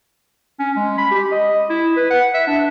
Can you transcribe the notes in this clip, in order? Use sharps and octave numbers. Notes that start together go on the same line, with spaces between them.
C#4
G#3
B5
G4
D#5
E4
B4
F#5
E5
D4